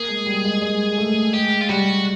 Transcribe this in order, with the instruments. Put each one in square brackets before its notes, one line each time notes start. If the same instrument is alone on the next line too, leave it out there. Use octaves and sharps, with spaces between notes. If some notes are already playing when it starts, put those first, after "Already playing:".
Already playing: [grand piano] A#3 [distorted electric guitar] G#4
[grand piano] G#3
G3
G#3
G#3
A3
[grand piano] G#3 [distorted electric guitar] G4
[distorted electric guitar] F4
[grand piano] G3 [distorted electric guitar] F#4